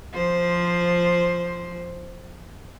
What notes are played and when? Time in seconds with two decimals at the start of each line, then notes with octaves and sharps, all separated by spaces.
0.13 F3 C5